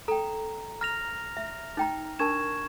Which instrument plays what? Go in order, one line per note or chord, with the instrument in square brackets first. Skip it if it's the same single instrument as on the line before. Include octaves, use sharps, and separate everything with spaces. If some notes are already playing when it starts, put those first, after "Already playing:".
[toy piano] A4 G5 [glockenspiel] A#5
[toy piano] A#5 [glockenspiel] F6 A#6 F7
[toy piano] E5
D#4 G5 A#5
[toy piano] D4 A#4 A5 [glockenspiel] C#6 G#6 E7